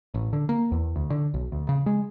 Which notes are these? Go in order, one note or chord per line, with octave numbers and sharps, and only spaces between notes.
A1
D3
A#3
E2
D2
D3
B1
D2
C#3
G#3